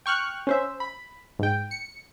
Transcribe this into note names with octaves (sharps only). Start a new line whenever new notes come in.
G5 C#6 F6 F#6
C#4 C5 E5
B5
G#2 G5
C#7